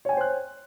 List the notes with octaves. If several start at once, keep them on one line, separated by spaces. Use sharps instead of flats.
C5 C#5 G5 G#5 F#6